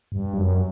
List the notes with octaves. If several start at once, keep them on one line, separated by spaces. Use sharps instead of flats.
G2
F#2